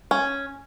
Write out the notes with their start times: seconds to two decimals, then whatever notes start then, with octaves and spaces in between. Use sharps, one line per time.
0.11 C#4